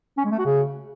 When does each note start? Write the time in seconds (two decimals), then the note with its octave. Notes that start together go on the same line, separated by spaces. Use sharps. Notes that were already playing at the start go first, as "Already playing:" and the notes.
0.17 C#4
0.25 G#3
0.32 A3
0.39 F#4
0.46 C#3